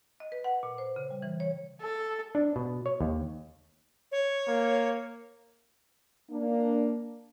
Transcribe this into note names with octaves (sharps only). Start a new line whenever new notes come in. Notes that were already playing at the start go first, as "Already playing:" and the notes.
D#5
B4
F#5
A#2
C5
C#3
G3
E3
C#5
A4
D4
B2
C#5
D#2
C#5
A#3
A#3 D4